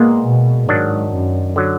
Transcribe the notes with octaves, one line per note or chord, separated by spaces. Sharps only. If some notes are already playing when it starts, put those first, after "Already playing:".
Already playing: A#2 G#3 A#3 B3 F4
B2
G#2 D#3 F#3 D4
F#2
D3 F#3